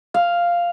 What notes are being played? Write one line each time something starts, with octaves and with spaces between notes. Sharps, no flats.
F5